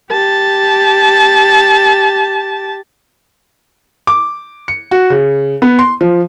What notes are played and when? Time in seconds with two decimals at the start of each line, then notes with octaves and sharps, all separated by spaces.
0.11 G4 A5
4.07 D6
4.68 C#7
4.91 F#4
5.10 C#3
5.62 B3
5.79 C6
6.01 F3